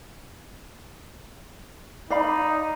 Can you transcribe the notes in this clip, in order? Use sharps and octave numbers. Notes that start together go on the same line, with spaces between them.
D#4 D5 F5 B5